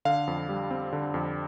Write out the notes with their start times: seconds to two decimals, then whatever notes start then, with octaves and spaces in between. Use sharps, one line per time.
0.05 D3 F5
0.27 F2
0.49 G3
0.71 C4
0.93 D3
1.14 F2